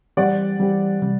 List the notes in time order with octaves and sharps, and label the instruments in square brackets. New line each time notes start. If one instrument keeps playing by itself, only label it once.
[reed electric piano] E3 G3 C4 G4 [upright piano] D5 F#5
[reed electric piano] E3 G3 C4 G4
C3 G3